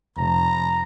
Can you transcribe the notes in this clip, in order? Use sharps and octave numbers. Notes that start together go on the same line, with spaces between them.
F1 A#5